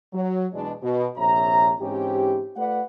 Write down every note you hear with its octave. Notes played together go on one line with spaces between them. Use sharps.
F#3
E2 B2 G#3 D4
B2
A#1 C3 C#5 E5 A#5
G#2 E3 C4 C#4 D#4 G4
A3 F4 B4 D5 F#5